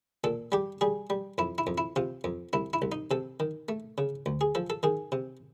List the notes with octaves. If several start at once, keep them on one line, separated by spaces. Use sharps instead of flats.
A#2 A4
G3 G4
G3 G#4
G3
F2 E4
E4
F2
E4
C3 F4
F2
C2 E4
E4
C2
D#4
C3 A4
D#3
A3
C#3
D2
G#4
F3 A4
A4
D#3 G#4
C3